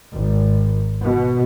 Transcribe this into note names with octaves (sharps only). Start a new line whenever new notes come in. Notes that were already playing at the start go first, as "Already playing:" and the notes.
G#1
B2